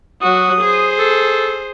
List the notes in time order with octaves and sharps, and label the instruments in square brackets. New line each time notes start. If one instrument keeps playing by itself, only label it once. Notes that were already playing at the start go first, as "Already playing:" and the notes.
[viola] F#3 F#4 [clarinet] D#6
[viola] G#4 C5
[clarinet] A4